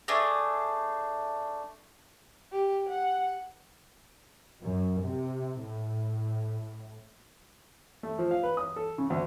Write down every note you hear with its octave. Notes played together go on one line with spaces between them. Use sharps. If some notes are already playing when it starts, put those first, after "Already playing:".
A3 D4 G#4
G4
F#5
F#2
C3
A2
A3
F3
F5
B4
D#6
A4
C#3
D2